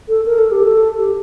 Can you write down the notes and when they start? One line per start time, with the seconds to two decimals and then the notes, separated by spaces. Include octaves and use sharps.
0.08 A4
0.26 A#4
0.38 A4
0.51 G4
0.63 A4
0.98 G4